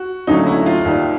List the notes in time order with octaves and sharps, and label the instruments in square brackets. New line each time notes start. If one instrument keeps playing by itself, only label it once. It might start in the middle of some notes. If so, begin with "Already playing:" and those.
Already playing: [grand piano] F#4
[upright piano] D#2 D3 F#3 A3 C#4 [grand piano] D#4
[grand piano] E4
F4
[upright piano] D#2 D#3 G3